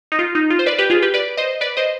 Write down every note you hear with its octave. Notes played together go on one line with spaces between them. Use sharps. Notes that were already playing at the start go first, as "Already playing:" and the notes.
D#4
F4
D#4
F4
C5
B4 D5
G4 B4
F4 G#4
G4 B4
B4 D5
C5 D#5
B4 D5
C5 D#5